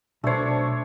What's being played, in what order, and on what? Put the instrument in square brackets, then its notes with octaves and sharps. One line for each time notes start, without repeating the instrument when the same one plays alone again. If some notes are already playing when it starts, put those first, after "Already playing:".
[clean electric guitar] B1 C5 [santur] A3 C#5 [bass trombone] D4